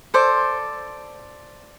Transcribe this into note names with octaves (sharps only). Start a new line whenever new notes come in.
A4 C5 D5